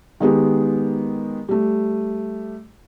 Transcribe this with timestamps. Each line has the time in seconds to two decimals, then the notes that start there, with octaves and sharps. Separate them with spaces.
0.20 D#3 G#3 B3 G4
1.49 G3 A3